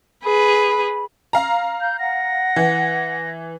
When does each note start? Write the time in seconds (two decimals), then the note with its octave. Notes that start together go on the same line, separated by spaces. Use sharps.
0.25 G#4 B4 B5
1.33 F5 A#5
1.81 G6
1.99 F#5 A#6
2.56 E3